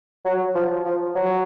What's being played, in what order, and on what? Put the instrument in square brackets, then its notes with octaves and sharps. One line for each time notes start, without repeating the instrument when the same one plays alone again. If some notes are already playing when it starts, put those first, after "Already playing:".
[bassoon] F#3
F3
F3
F#3